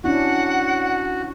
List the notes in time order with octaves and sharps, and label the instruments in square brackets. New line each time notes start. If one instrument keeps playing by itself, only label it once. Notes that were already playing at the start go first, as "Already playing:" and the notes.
[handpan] C#4 D4 E4 [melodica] F#4 [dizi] F#5